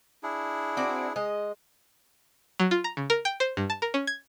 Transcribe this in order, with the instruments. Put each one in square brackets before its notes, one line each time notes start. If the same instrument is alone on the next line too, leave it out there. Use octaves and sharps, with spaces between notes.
[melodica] D4 E4 G#4
[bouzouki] C4 F#4 D5
G#3 D#5
[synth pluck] F#3
F4
A#5
C#3
A#4
G5
C5
G2
A5
A#4
C#4
G#6